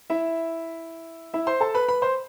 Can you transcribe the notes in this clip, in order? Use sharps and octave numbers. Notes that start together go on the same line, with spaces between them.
E4 E5
E4 E5
C5 C6
A4 A5
B4 B5
B4 B5
C5 C6